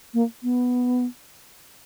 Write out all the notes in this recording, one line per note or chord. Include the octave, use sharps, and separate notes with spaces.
A#3
B3